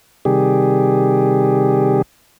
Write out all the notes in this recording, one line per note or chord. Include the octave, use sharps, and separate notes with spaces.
C3 D#3 G3 G4 G#4